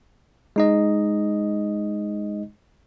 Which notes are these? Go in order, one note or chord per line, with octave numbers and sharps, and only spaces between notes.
G#3 D#4 D#5